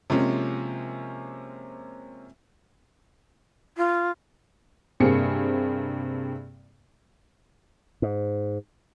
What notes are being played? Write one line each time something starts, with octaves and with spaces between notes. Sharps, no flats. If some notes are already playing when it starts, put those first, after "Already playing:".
C3 F3 G#3 A#3 C4 C#4
F4
G2 C3 A#3 C4 G#4 C#7
G#2